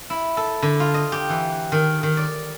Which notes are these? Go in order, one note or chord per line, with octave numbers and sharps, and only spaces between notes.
E4
A4
D3
F4
D#5
G4
E3
D#3
D#3
D5